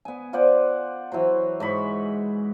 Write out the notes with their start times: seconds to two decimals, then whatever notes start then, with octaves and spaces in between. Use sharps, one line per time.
0.05 B3 G#5
0.33 F4 C5 D5 F#5
1.12 E3 F#3 F#4 C5
1.60 G#2 G#3 B5 C#6